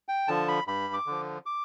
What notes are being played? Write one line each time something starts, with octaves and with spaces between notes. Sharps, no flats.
G5
D3 F3 A5
B5
G2 B5
D6
D3 F3
D6